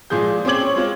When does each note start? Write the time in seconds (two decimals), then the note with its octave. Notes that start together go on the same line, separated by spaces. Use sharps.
0.10 A#2 F3 G#3 G#4 G6
0.45 C4 C#4 G#4 D6 G#6 F#7
0.62 C#6
0.76 G#3 C4 F4 C#5